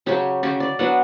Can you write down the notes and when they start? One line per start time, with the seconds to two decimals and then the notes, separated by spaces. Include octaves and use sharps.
0.06 C#3 F#3 C#4 G4
0.43 C#3 F#3 C#4 G4
0.60 D5
0.79 F#3 B3 D4 F#5